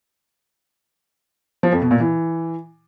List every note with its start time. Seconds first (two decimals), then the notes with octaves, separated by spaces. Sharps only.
1.63 F3
1.72 F2
1.82 B2
1.91 A#2
2.00 E3